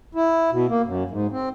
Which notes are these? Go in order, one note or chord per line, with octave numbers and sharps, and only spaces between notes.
E4
B2
A#3
F#2
G#2
C4